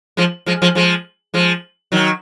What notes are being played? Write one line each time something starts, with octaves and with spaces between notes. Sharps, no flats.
F3 G#3
F3 G#3
F3 G#3
F3 G#3
F3 G#3
D#3 F#3